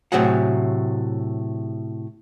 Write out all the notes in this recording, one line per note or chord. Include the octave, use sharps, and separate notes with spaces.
A2 C3 F#3 F#4 G#4 F#5